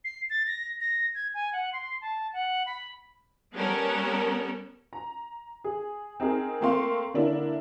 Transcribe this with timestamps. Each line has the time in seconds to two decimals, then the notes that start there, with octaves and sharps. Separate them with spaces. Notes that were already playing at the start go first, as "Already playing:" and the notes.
0.04 C7
0.30 A6
0.47 A#6
0.81 A#6
1.15 G#6
1.34 G#5
1.53 F#5
1.73 C6
2.01 A5
2.33 F#5
2.66 B5
3.54 G3 B3 C#4 A4 A#4
4.93 A#5
5.64 G#4
6.20 C4 D#4 G#4 A#4
6.61 A3 A#3 C4 F5 C6 C#6
7.14 D3 A#3 D4 E4